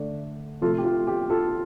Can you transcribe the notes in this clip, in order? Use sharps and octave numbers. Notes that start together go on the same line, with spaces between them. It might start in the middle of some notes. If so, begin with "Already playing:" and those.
Already playing: D3 A3 D4
C3 F3 A3 F4 A4
G4
F4
G4
F4 A4